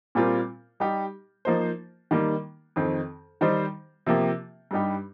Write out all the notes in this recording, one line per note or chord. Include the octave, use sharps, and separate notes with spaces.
A#2 G3 C4 F4 A#4
G3 D#4 G4
F3 A#3 D#4 C5
D#3 G3 A#3
F2 D#3 C4
D#3 G3 D#4 C5
C3 F3 A#3 G4
G2 G3 D#4 G4